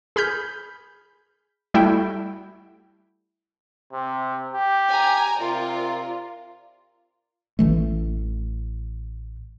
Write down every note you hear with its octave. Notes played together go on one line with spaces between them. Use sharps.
G#4 B5 F6 G6 B6
G3 A3 E4 F#4 G5
C3
G4
G#5 A#5
C3 F4 A#4 D5
A1 E3 A3